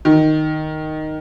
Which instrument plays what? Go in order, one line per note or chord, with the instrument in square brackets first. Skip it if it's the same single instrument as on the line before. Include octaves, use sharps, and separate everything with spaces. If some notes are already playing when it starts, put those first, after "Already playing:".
[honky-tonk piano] D#3